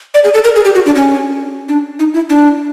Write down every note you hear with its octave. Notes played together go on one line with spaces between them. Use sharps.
D5
G#4
A4
A#4
G#4
G4
F#4
D4
C#4
D4
D#4
E4
D4